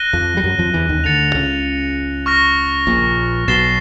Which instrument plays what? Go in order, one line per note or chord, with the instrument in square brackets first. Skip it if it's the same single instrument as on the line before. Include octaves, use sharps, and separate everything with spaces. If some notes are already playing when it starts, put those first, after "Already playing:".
Already playing: [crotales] F#6 A#6 D#7 G7
[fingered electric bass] F2 F3
G3
F#2 F#3
F2 F3
E2 E3
D#2 D#3
C#3
[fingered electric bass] D2 D3 [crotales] A6 C#7 F7
[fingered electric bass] C#2 C#3
[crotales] C#6 F6 A#6
[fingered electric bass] A#1 A#2
[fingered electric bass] B1 B2 [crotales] A6 C7 E7 G7